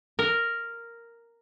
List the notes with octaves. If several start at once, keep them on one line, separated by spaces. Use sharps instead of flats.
A#4